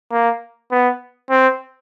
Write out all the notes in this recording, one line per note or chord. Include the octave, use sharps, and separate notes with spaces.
A#3
B3
C4